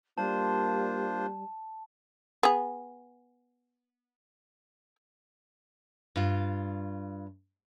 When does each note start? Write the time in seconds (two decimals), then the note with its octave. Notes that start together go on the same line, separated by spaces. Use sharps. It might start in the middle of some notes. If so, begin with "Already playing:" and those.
0.18 G3 A#3 D4 F4 C5 A5
2.43 B3 G#4
6.16 G2 F4